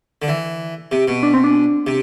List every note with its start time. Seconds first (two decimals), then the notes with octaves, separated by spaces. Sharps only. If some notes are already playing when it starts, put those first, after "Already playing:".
0.22 D3
0.28 E3
0.92 C3
1.08 B2
1.23 D4
1.34 C4
1.44 D4
1.87 C3